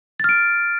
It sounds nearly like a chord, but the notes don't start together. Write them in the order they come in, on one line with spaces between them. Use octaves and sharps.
A6 F6 D7